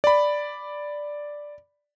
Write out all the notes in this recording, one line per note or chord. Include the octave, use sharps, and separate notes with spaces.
D5 B5